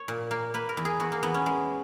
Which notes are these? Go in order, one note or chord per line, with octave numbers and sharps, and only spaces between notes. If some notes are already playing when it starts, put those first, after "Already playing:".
Already playing: C#5
A#2
A#3
A#3 B4
A#4
E2
G#4
E2 F#4
A#3
E2 B3
C#4
G#3